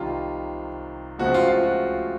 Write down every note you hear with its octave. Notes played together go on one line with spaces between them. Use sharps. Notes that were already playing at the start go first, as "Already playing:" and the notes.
Already playing: C2 C3 D#3 F4
C#2 C#3 F3 A3 C4 F#4
F4
F4
F#4